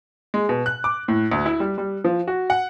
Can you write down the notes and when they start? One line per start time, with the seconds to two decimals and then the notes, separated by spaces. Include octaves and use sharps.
0.34 G#3
0.49 B2
0.66 F#6
0.84 D6
1.08 A2
1.32 D2
1.46 E4
1.60 G3
1.78 G3
2.04 F3
2.28 F#4
2.50 F#5